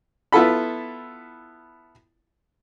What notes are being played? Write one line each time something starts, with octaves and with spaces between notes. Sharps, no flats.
B3 E4 F4 A4 B5